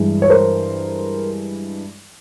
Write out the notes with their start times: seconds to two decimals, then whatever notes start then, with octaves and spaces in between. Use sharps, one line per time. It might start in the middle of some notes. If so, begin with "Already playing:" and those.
Already playing: G2 E3 G#3
0.22 C#5
0.30 A#4 C5